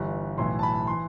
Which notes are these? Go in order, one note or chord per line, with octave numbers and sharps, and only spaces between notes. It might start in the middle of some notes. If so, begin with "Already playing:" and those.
Already playing: G1 G2 E3
B1 A2 E3 C6
A5
B5
E3 C6